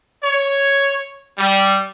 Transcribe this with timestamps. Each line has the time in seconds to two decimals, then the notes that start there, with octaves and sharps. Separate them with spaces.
0.24 C#5
1.38 G3